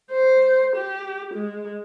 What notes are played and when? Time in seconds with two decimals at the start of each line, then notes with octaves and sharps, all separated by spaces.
0.11 C5
0.76 G4
1.34 G#3